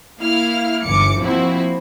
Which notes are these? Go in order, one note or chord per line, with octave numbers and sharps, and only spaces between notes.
A#3 E4 F5 F6
G1 G#2 E3 D6 C#7
F3 A#3 C4 E4 F#4